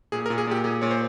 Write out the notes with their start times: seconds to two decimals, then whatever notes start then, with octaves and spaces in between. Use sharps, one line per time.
0.12 A#2 G#4
0.26 A#4
0.30 A#2
0.38 G#4
0.47 A#2 G4
0.64 A#2 G#4
0.81 A#2 C#5
0.91 C5